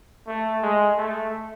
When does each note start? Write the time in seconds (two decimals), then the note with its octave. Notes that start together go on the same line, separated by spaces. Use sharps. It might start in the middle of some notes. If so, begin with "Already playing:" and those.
0.27 A3
0.63 G#3
0.97 A3